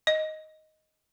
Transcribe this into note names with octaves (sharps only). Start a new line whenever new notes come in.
D#5